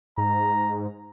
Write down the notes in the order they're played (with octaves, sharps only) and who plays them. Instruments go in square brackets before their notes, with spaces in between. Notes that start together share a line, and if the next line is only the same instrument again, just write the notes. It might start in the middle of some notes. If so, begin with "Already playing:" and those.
[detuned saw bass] G#2 [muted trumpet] A#5